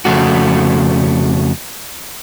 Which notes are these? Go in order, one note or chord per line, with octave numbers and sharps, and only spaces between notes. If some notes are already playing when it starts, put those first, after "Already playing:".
F2 C#3 A3 F#4